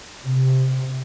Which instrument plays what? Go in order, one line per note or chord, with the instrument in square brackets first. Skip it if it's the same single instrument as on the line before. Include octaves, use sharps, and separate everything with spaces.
[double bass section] C3